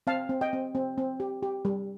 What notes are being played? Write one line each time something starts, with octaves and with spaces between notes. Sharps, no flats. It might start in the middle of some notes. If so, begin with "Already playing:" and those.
C4 F5 A5
C4
D#5 G5
C4
C4
C4
G4
G4
G3